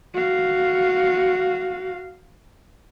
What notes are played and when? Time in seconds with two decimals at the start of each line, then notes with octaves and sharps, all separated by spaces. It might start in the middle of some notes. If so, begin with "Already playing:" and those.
0.14 F#4 F5